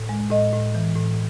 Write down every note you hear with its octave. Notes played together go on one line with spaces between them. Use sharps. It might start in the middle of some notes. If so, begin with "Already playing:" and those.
Already playing: A2
G#3
A2 D#5
A2
E3
A2